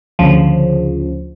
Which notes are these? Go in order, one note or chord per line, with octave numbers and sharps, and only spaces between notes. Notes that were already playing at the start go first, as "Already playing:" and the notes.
D2 C#3 F3